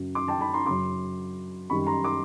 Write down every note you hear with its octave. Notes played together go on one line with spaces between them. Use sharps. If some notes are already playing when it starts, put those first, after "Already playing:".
Already playing: F#2 C#3 F#3
C6 D6
G5 A5
A5 B5
A#5 C6
F#2 C#3 F#3 C6 D6
F#2 D#3 G3 B5 C#6
A#5 C6
C6 D6